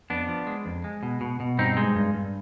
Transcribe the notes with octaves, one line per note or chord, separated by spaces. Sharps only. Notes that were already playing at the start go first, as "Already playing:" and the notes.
F2 B3 D4
F3
G#3
F2
G#3
B2
B2
B2
G2 C4 D#4
G#3
G2
G2